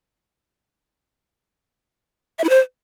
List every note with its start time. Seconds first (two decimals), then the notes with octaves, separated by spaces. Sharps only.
2.39 E5
2.44 E4
2.49 C5